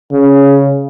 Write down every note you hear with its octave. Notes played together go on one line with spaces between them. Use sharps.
C#3